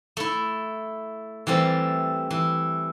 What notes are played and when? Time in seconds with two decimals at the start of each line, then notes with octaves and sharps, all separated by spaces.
0.17 A3 E4
1.47 E3 G3 A3 C4
2.30 E3